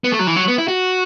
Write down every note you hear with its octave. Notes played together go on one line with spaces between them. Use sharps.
B3
A3
F#3
E3
F#3
B3
E4
F#4